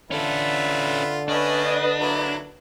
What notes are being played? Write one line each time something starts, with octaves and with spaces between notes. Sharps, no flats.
D3 C#4 F4 A4 B4 E5
A3 C#4 D4 B4 D#5 D#6
F#3 A#3 E4